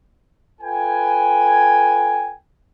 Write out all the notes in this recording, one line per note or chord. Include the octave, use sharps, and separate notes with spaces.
F4 A4 B4 G5 G#5